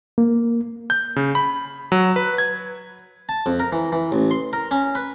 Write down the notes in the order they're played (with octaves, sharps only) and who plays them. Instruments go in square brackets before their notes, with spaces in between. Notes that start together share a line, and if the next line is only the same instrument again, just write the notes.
[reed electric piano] A#3
[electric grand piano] G6
C#3
B5
F#3
B4
G#6
[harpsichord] A5
F2
A#4
E3
E3
A1
C6
A#4
C#4
B4